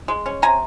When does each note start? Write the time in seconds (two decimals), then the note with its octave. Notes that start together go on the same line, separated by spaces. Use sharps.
0.08 G#3
0.26 C#4
0.42 C3 G#5 A#5